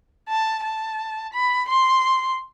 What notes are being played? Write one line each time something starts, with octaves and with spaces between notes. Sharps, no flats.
A5
A5
B5
C6